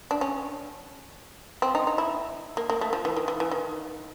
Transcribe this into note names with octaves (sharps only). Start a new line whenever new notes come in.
D4
C#4
C4
D#4
D#4
E4
A#3
A#3
A3
F3
E3
D#3
E3
E3
D#3